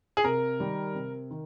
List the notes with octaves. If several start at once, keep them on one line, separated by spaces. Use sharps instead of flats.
G#4
C3 A#4
D#3 G3
C3
D#3